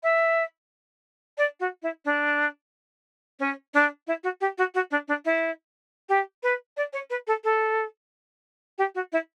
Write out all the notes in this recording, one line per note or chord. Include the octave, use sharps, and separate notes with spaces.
E5
D5
F#4
E4
D4
C#4
D4
E4
F#4
G4
F#4
F#4
D4
D4
E4
G4
B4
D5
C#5
B4
A4
A4
G4
F#4
E4